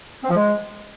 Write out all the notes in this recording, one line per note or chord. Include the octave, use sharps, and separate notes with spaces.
C4
F3
G#3